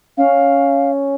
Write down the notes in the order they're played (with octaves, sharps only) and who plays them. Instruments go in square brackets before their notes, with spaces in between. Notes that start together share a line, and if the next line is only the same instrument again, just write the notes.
[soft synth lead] C#4 [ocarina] F5